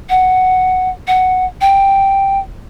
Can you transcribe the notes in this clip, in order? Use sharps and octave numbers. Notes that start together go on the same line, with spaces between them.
F#5
F#5
G5